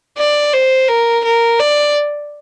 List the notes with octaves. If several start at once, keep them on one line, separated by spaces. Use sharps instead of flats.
D5
C5
A#4
A#4
D5